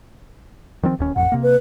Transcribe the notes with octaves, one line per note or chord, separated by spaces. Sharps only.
D#3 F3 C4
D1 D#2 C#4
A1 F2 A#2 F#5
C3 A#3
B4